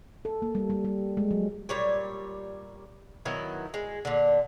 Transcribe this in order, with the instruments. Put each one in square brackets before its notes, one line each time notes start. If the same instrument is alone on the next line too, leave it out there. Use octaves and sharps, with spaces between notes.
[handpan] A4
A#3
G3
G3
G3
G#3
F#3
[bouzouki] A#2 G3 C#5
D#3 F#3 B3 E4
G#3
A#2 D3